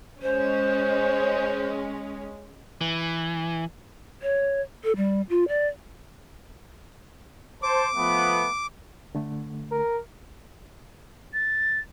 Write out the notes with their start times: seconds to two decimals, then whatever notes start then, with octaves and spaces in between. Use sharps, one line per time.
0.22 G#3 C#4 C5
2.81 E3
4.22 C#5
4.84 A4
4.96 G3
5.30 F4
5.48 D5
7.63 C5 A5 D6
7.95 F3 A3 B3
9.15 D3 A3
9.72 A#4
11.34 A6